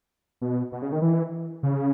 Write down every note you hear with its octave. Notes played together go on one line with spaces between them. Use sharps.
B2
B2
C#3
D#3
E3
C#3